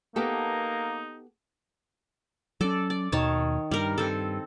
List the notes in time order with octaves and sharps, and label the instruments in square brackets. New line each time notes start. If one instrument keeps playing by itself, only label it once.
[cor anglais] A#3 [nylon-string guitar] B3 G4 A4 [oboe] D#4
[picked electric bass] F#3 C#4 [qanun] A4 D5
[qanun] D5
[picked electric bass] D#2 B2 [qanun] D#3 C#5 A5
[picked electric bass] G2 [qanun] G3 A#4
[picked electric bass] G2 [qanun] C4 A4